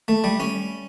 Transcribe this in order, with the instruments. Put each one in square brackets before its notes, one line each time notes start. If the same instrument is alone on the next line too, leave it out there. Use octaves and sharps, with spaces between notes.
[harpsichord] A3
G3
C#4